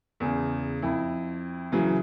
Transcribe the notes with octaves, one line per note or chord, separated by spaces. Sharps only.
E2 C#3
F2 E4
C#3 E3 F#3